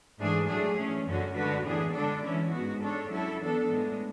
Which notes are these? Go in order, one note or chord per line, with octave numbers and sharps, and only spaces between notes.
G#2 E3 A3 D4 G#4
A2 F#3 A3 D4 G#4
E3 A3 C#4
F#2 D3 F#3 C#4 F#4
D3 G#3 D4 F#4 B4
A2 E3 B3 D4 G#4
D3 G#3 D4 A4 D5
E3 G#3 C#4 E4
G#2 G#3 B3 F#4
G#3 D4 A4 C#5
F#3 C#4 E4 A4
E3 B3 D4 A4
A2 G#3 B3 D4